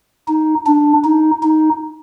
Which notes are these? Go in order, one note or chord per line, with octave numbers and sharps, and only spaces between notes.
D#4
D4
D#4
D#4